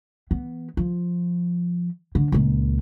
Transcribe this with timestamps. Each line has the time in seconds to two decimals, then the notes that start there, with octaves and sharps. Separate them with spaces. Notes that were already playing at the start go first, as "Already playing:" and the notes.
0.31 E3 B3
0.77 F3
2.15 D3
2.32 C#2 A#2